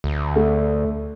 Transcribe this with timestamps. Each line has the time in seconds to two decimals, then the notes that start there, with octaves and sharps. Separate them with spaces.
0.04 D2
0.36 A3